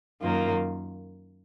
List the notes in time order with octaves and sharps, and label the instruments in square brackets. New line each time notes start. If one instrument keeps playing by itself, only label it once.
[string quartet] F#2 D#3 A#3 F4